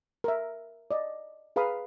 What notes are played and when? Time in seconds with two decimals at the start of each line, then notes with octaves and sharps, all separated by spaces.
0.24 A#4 E5
0.91 D5 D#5
1.56 G#4 B4 F5 A#5 B5 D#6